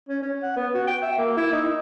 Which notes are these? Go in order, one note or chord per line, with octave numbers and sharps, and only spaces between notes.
C#4
C#4
F#5
B3
F#4
G5
E5
A#3
E4
D#4